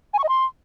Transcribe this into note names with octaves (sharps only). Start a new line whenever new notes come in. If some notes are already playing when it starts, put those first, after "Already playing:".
G#5
C#6
D#5
C6